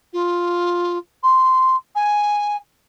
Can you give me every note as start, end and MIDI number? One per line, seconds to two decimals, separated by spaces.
0.13 0.98 65
1.23 1.76 84
1.95 2.56 80